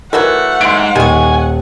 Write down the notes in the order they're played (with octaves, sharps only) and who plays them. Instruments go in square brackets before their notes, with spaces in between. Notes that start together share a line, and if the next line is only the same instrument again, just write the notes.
[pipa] E3 F#3 A3 [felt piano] A#4 [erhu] F#5
[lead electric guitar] G#2 [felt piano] C6 D7
[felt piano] D#1 [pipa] D#3 C#6 [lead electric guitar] G#5